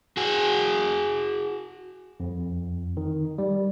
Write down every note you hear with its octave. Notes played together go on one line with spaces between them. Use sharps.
F#4 G#4
F2
D#3
G3